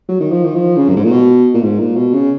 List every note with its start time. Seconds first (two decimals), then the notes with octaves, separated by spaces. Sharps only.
0.09 F#3
0.20 D#3
0.31 F3
0.45 D#3
0.55 F3
0.76 C#3
0.89 F#2
0.96 G#2
1.04 A#2
1.11 B2
1.54 A#2
1.62 G#2
1.79 A#2
1.96 B2
2.14 C#3